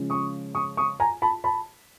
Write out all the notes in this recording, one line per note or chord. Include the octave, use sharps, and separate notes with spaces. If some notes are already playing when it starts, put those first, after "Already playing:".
Already playing: C#3 F3 G#3 C#4
C#6 D#6
C#6 D#6
C#6 D#6
G#5 A#5
A5 B5
A5 B5